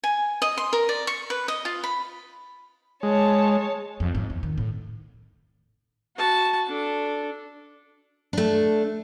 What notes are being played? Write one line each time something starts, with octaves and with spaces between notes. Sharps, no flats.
G#5
D#5
C6
A#4
D5
C#6
B4
D#5
F4
B5
G#3 C#5 A5
F2
G#2
E2
D#3
A2
F#4 A5
D4 A4
A3 D4